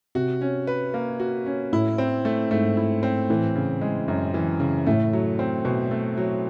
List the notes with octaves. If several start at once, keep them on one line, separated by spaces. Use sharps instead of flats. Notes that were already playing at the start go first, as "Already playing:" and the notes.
C3 F#4
C#4
B4
A#3
F#4
C#4
A2 E4
C4
A3
G#2 A3
E4
C4
A2 E3
C#3
G#3
F#2
E3
C#3
A2 A3
F#3
C4
B2
A3
F#3